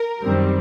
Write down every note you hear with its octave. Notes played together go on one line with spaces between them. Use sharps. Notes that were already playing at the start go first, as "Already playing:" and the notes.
Already playing: A#4
F#2 D#3 G3 C4